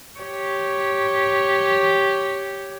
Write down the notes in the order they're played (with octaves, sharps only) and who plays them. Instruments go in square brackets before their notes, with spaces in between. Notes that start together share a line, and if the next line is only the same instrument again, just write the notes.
[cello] G4 C#5